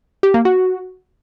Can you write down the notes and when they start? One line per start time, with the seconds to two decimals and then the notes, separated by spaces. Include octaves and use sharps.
0.23 G4
0.34 A#3
0.45 F#4